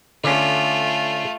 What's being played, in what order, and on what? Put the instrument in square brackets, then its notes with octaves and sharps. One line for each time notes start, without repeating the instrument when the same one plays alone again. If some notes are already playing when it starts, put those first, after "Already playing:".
[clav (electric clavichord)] D3 C#4 [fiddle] A3 F4